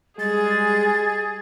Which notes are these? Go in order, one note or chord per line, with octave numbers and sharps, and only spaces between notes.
G3 G#3 G#4 A6